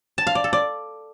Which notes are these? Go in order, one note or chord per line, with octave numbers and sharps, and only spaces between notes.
A5
F5
D5
A4
D5